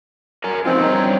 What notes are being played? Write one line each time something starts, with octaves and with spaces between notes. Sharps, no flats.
A#4 G#5 A#5
F3 C4 D#4 F4
G2 C#5 A#5